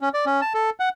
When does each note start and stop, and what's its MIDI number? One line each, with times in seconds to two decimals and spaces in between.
0.01 0.09 61
0.14 0.25 74
0.26 0.41 61
0.41 0.53 81
0.54 0.70 69
0.80 0.89 78